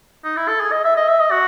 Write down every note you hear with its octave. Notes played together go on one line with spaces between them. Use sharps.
D#4
E4
A4
G#4
D#5
E5
D#5
E5
D#5
F#4